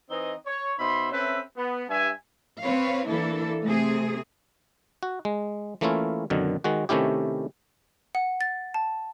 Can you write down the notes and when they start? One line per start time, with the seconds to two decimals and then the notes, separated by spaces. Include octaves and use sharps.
0.10 E3 C4 D#4 D#5
0.46 C#5
0.79 B2 D#4 C5 E5 B5 C6
1.11 C4 C#4 A4 B4 E5
1.57 B3
1.89 G2 E5 G#5
2.61 C4 B4 C#5 F5
3.07 E3 A#3 D4 E4 A4
3.64 C3 A3 C4 G#4
5.03 F#4
5.25 G#3
5.81 E3 A3 A#3 C#4 E4 F4
6.30 F#2 B2 D3 D#3
6.64 D#3 G#3 F#4
6.89 C3 D#3 A3 C#4 E4 G4
8.15 F#5
8.41 A6
8.74 A5